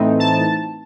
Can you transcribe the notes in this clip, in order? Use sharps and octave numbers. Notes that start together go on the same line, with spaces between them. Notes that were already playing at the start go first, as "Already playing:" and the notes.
Already playing: A2 E3 A3 C4 D#4
A5